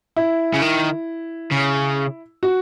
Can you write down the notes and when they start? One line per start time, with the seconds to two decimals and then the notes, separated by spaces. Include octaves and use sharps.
0.16 E4
0.54 C#3
0.62 D#3
1.52 C#3
2.43 F#4